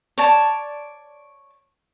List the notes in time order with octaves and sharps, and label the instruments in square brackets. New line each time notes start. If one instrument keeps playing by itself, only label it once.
[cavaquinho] C#5 D5 A5